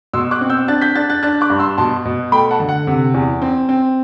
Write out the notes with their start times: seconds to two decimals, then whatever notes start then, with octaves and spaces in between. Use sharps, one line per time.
0.13 B2 C6 E6
0.31 D6 F#6
0.41 C4
0.50 E6 G6
0.68 D4 F#6 A6
0.81 G6 B6
0.95 D4 F#6 A6
1.10 F#6 A6
1.23 D4 F#6 A6
1.41 D6 F#6
1.50 G2
1.59 C6 E6
1.78 B2 A5 C6
2.05 B2
2.32 A3 G5 B5
2.51 F#5 A5
2.60 D3
2.69 F#5
2.87 C3
3.14 E2
3.42 C4
3.69 C4